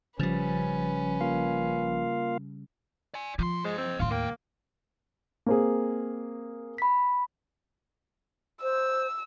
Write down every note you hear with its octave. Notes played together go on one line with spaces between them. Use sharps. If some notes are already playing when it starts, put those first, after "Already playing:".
G#1 C#3 F3 G3 C#4 B4 A6
A#3 F4 F5
D5 G#5
A#2 F3 C6
G#3 C5 D#5
C4
D#2 A2 C#4 F5 C6
C#2 A#3 G5
A#3 C4 G#4
B5 B6
C5 E6